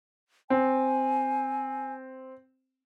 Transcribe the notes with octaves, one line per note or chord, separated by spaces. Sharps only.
C4 G#5